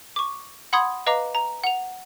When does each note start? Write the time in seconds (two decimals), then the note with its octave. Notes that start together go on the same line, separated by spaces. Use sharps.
0.16 C#6 D6
0.73 F#5 B5 C6 D#6 G#6
1.07 B4 D#5 F5 A#5 D6
1.35 A#5
1.64 F#5 F7